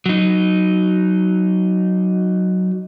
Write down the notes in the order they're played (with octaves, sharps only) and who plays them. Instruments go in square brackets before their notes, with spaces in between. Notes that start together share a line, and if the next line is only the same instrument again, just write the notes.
[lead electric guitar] F#3 D#4